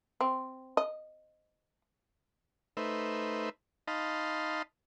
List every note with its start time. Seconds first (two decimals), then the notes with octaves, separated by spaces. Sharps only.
0.21 C4
0.77 D#5
2.77 A3 D#4 B4 C5 E5
3.88 D#4 D#5 F5 A5 B5 C6